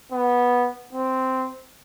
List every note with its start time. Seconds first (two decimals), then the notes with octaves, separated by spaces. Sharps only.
0.12 B3
0.93 C4